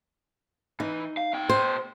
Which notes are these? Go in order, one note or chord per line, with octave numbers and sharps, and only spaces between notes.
E3 D#4
F5
B2 G5
C5